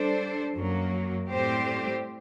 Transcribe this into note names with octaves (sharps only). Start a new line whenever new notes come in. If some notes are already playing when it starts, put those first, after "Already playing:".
Already playing: G3 D4 A4 C5
F#2 F#3 A#3
A2 G3 C4 G4 C5